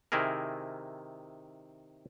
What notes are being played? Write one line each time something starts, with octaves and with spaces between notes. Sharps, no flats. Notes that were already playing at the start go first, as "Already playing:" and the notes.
C3 D#3 E4 G#4 A#4